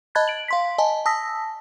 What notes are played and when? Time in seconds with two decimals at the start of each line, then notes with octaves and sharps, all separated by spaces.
0.15 D#5 A5 B5 F#6 G#6 A6
0.28 D7 F#7
0.48 F5 C6 B6
0.78 D#5 G#5 A5
1.06 A5 D#6 E6 A#6 B6